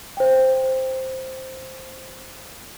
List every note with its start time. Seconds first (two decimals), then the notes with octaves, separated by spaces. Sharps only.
0.17 C5 G5